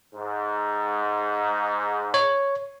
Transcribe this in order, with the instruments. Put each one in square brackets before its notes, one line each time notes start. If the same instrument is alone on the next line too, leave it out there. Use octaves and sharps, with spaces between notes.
[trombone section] G#2
[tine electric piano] C#5